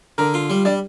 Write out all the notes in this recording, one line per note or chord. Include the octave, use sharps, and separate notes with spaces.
D3 A#4
F4
G3
G3 D4